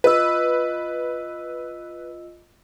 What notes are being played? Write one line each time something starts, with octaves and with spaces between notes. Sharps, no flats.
F4 B4 D#5 E6